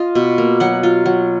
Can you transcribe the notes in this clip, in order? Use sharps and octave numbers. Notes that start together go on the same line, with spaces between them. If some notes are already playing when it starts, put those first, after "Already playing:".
Already playing: F4 D#5
B2
A#3
F#3 F#5
F4
F#3